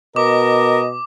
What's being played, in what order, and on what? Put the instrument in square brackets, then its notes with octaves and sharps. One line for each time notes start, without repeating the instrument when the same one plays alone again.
[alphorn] B2 [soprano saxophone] A#4 [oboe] D#5 [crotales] D6